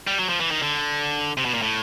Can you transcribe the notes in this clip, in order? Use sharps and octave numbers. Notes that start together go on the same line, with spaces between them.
G3
F#3
F3
E3
D#3
D3
C3
B2
A#2
A2